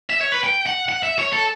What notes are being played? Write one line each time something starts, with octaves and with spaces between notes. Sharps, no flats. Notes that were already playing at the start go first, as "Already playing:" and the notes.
E5
C#5
B4
G5
F#5
F#5
E5
C#5
A4